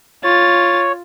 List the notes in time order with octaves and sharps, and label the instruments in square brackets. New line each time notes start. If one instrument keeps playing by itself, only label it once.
[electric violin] F4 A6 [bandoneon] C#5